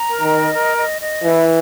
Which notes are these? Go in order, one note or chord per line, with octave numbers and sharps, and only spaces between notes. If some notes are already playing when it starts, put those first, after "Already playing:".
Already playing: A#5
A#4
D#3
D#5
A#4
D#5
D#5
E3 E4